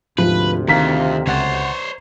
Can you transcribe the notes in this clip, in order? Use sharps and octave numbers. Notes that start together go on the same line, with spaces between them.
D2 G#2 C3 F3 B4
F2 D#3 F5 A#5 F6 B6
C#2 C5 C#5 F#5 A6